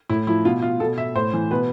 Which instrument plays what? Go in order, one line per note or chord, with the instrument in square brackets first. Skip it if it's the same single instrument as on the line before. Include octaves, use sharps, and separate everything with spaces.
[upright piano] A2 E4
F3 E4
B2 F4
F4
B2 A4
E5
A2 C5
E3
B2 B4